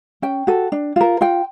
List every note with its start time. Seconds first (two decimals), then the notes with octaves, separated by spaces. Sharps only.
0.22 C#4 G5
0.47 F#4 A4
0.72 D4
0.96 F4 A#4
1.21 F4 G5